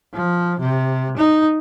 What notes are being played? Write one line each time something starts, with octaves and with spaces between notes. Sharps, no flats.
F3
C3
D#4